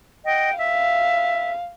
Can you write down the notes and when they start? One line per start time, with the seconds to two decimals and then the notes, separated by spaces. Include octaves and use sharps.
0.25 D#5 F#5 G5
0.58 E5 F5